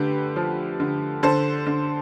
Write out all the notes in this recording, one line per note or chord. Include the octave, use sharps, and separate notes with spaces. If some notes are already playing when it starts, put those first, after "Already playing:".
Already playing: D3 A3 G4 B4
F3
D3
D3 A4 C5
D3